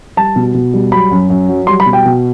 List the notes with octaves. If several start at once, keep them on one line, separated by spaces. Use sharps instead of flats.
G3 A5
B2
B2
G3
F#3 B5
F#2
F#2
F#3
G3 C6
B5
B2
G5
B2